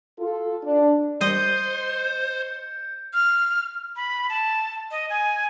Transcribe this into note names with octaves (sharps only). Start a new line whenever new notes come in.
F4 A4
D4
G3 C5 D#5 G6 C#7
F6
B5
A5
D#5
G#5